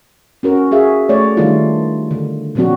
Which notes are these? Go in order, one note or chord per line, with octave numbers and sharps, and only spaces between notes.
C#4 F#4 A#4
F#4 G#4 E5 F5
A3 C#5 D5
D#3 G3 A3 D4 D#4 F4
D3
A#2 F3 F#3 C4 D4 F#4